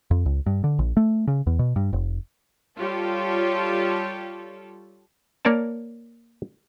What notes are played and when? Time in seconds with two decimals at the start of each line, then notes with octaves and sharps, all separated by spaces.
0.11 F2
0.26 C#2
0.46 G2
0.64 D3
0.79 A#1
0.97 A3
1.27 C#3
1.47 E2
1.59 B2
1.76 G2
1.93 F1
2.78 G3 F4 G4 A4 C#5
5.45 A#3 A#4 C#5 D5 A5